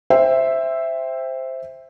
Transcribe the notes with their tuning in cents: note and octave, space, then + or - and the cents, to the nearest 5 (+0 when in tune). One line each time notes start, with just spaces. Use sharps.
C5 +0 E5 +0 G5 +20